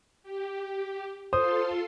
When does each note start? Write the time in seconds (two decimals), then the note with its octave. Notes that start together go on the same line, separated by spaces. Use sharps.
0.23 G4
1.33 F4 A4 C5 C6 D#6